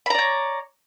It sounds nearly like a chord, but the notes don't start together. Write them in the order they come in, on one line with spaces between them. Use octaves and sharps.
B5 A#5 D5 C#5